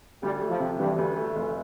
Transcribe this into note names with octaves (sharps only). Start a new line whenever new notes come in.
D2 G3
A3
F3
C3
G2 E3
D2
A3
F1